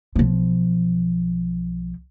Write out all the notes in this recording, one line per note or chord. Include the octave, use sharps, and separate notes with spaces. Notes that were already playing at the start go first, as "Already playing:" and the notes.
B1 F3